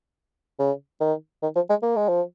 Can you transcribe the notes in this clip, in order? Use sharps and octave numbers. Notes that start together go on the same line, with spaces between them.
C#3
D#3
D#3
F3
G#3
A#3
G#3
F3